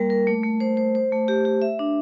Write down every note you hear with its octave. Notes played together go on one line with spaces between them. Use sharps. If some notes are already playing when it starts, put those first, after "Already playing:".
Already playing: G3 A#3 A#4
A#4
A3
A3
C5
C5
C5
A3
G4
G4
E5
D4